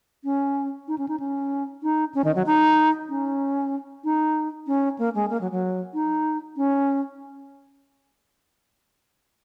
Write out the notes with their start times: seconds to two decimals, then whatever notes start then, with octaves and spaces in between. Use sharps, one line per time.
0.24 C#4
0.88 D#4
0.98 C#4
1.09 D#4
1.20 C#4
1.83 D#4
2.14 C#4
2.24 D#3
2.35 F#3
2.46 D#4
3.09 C#4
4.04 D#4
4.67 C#4
4.99 A#3
5.15 G#3
5.30 A#3
5.41 F#3
5.52 F#3
5.94 D#4
6.57 C#4